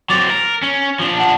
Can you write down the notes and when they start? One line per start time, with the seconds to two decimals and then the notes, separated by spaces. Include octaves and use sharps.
0.10 F#3 C4 D6 A6 F7
0.30 A#4
0.62 C#4
0.99 F3 D4
1.17 F#5 A5